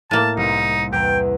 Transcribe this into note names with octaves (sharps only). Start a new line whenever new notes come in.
A2 A#3 A5
C2 D#4
E2 G5 A#5